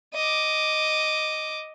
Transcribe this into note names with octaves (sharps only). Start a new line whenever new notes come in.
D#5 D6